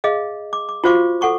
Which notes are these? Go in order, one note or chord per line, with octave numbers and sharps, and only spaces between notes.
G#4 D#5 F5
D6
D6
F4 F#4 C5 F5 C#6 D6
A4 F#5 C#6 D6